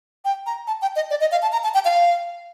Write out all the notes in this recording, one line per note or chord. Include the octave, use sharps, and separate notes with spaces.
G5
A#5
A5
G5
D#5
D5
D#5
F5
A5
A#5
A5
G5
F5